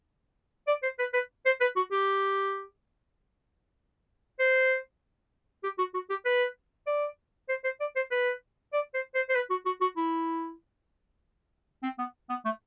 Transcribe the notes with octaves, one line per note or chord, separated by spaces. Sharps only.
D5
C5
B4
B4
C5
B4
F#4
G4
C5
G4
F#4
F#4
G4
B4
D5
C5
C5
D5
C5
B4
D5
C5
C5
C5
B4
F#4
F#4
F#4
E4
C4
B3
B3
A3